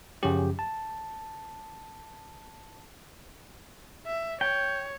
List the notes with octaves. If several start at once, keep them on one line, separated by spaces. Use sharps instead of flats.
F#2 C#3 F3 F#3 C#4 G4
A5
E5
C#5 G5